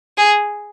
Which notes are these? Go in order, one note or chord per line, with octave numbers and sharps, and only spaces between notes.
G#4